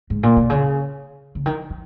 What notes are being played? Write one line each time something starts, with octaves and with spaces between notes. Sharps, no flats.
G#2
A#2
B2
C#3
C#3
D#3
F3